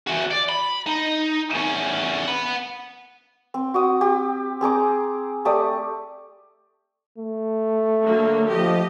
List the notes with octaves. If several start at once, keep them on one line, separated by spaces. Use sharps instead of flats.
E3 F#4
D5
B5
D#4
E2 C#4
F#5 B5
C4
F#4 D6 D#6
G4
C4 G#4 A#5 D6
A3 G4 D5 D#6
A3
D3 F#3 A#3
F3 G4 D#5